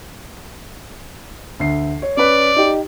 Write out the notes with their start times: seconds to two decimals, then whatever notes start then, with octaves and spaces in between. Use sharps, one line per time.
1.60 D2 C7
2.02 C#5
2.17 C#4 B4 D5
2.56 D#4 G4